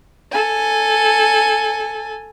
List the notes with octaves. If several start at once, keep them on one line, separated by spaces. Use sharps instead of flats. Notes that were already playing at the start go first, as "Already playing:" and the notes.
A4 G#5